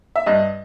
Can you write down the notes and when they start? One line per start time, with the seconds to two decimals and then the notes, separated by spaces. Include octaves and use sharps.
0.16 E5
0.26 G2 D#5